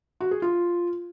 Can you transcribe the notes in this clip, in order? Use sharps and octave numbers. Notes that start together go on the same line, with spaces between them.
F#4
G#4
F4